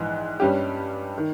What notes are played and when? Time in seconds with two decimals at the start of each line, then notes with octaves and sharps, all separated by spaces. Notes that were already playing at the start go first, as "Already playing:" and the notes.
Already playing: A#1 G#2 E3
0.40 G2 G3 C#4 G4
1.18 D#3